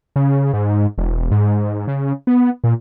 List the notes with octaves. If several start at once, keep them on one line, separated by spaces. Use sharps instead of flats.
C#3
G#2
E1
G#2
C#3
B3
A#2